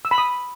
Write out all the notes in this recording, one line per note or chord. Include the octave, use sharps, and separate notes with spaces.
E6
B5
D#6